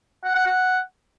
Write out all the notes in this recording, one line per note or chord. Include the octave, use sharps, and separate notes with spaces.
F#5
F#5
F#5